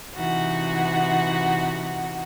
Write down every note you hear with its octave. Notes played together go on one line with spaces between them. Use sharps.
C3 E3 D#4 F#4 F#5